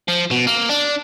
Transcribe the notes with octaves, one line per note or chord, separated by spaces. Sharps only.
F3
B2
A#3
D4